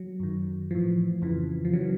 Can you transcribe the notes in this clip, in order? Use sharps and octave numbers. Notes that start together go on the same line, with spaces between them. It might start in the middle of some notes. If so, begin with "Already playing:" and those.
Already playing: F#3
F#2 D#3
A2 E3 F3
F2 C#3 E3
F3
C#3 E3 F#3